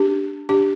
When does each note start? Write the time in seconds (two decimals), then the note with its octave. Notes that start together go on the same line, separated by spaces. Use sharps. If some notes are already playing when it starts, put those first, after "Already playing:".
Already playing: D4 G4
0.49 D4 G4